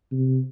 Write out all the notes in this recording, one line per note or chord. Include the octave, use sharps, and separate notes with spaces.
C3